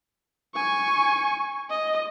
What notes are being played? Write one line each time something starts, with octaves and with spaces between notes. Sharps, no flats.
G#5 C#6
D#5